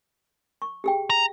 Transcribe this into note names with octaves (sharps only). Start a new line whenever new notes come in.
C#6
G4 G#4 G5
A#5